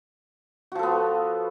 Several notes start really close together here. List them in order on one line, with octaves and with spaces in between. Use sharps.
F#4 F3 A4 B3